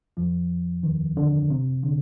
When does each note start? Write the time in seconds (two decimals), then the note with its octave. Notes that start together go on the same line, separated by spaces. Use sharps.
0.17 F2 F3
0.83 D#2 D#3
1.17 D3
1.50 C3
1.83 D3